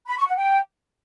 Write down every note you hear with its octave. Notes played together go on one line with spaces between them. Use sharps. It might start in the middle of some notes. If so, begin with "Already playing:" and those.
B5
C#6
F#5
G5